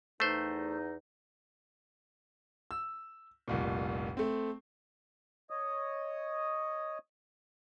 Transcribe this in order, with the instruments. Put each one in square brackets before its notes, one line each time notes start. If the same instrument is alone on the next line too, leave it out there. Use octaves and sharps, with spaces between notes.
[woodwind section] E2 D#4 [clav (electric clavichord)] A3 C5
[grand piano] E6
F1 C2 A#2
A3 C4
[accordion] C#5 D#5 D#6